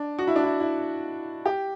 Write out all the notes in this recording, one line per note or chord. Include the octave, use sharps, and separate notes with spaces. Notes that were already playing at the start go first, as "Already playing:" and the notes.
Already playing: D4
F#4
E4
D4
E4
E4
G4